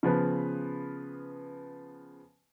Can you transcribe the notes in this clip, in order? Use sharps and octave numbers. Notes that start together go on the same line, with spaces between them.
C#3 F3 B3 B4